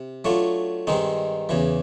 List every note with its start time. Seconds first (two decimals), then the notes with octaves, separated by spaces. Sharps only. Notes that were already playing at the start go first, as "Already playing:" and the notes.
Already playing: C3
0.25 F#3 A3 D4 F4
0.87 G2 D#3 G#3 C4 D#4
1.49 E2 C#3 E3